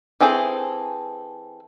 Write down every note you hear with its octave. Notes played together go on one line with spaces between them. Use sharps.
E3 C4 G#4 A4 C5